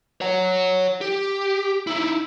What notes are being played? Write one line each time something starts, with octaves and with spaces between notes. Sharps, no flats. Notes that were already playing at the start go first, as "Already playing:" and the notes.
C#5 F#5
G4
D#4 E4